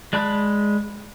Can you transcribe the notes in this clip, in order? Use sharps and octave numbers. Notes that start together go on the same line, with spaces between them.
G#3 D5 A5 B5 F#6